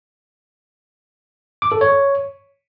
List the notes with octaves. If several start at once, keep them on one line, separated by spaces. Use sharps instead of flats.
D6
A4
C#5